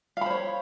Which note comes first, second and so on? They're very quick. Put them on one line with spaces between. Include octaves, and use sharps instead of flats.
F5 B5 C5 C#5